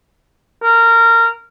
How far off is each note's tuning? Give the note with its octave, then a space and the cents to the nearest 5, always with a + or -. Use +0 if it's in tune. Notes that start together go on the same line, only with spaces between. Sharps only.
A#4 -20